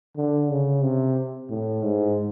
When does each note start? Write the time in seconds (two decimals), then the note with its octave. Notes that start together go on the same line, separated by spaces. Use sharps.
0.17 D3
0.50 C#3
0.83 C3
1.50 A2
1.83 G#2